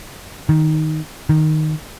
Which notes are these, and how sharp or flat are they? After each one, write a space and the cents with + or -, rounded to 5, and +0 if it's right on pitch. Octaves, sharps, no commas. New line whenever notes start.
D#3 +5
D#3 -5